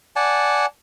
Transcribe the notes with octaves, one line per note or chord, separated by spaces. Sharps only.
D5 F#5 G#5 A5